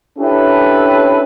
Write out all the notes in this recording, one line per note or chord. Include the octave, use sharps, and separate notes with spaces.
C#4 D4 E4 G4 A4 B4